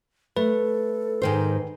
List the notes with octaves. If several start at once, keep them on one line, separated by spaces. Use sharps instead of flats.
A3 A4 B4
G#2 D#3 C5